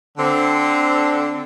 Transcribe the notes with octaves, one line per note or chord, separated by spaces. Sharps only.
D3 C4